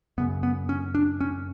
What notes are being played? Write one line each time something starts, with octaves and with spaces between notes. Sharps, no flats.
F#2 C#3 B3
B3
C#4
D4
C#4